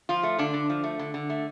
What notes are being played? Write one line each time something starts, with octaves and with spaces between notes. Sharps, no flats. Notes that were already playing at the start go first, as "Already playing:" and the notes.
F3 F4
A3
D3 D4
D3
F3
A3
D3
D3
A3